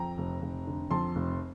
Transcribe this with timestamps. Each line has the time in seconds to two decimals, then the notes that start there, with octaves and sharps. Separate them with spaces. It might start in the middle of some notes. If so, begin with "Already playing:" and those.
Already playing: F2 G5 A#5
0.18 F1
0.42 F1
0.67 D3
0.90 F2 A5 C6
1.15 F1